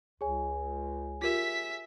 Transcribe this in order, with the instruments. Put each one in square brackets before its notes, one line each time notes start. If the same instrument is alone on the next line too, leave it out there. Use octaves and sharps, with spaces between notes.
[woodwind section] C#2 [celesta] G#4 C#5 G#5
[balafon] F4 G4 A#4 [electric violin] E5 B6